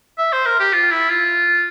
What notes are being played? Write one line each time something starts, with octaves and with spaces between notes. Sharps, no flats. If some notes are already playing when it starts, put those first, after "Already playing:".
E5
C5
A#4
G4
F4
E4
F4